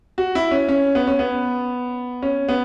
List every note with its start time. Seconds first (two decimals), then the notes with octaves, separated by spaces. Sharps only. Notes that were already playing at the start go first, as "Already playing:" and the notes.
0.18 F#4
0.35 E4
0.51 C#4
0.68 C#4
0.95 B3
1.07 C#4
1.19 B3
2.22 C#4
2.49 B3